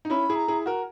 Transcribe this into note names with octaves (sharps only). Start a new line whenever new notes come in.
D#4
C#4 E4 B5
E4 G#4
A#5
E4 G#4
F#4 A#4